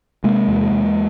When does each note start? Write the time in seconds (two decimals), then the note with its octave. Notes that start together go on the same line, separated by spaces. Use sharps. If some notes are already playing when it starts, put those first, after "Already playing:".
0.24 C3 G#3 A#3
0.48 E2
0.71 E2